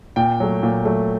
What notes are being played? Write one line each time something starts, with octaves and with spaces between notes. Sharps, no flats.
A#2 G5
F#3 A3
A#2
F#3 A3